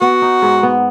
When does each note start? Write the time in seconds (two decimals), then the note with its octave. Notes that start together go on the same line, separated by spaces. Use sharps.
0.01 B3 F#4
0.22 D#4
0.42 G#2
0.63 B3